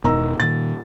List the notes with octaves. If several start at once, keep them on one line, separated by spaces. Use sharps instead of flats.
E1 B2 D#3 A#5 E6
A#2 D#3 A6